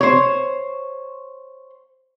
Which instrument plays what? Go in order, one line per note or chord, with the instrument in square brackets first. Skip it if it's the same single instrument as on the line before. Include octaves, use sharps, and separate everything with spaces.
[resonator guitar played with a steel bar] C5 C#5